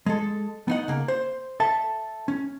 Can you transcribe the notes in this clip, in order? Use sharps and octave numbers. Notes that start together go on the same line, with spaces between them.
G#3 A4
B3 D#4 F#5
C#3 A#3
C5
A4 E5 A5
C#4